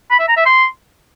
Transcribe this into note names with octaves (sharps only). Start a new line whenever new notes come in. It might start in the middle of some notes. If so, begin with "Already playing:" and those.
B5
E5
A#5
E5
C6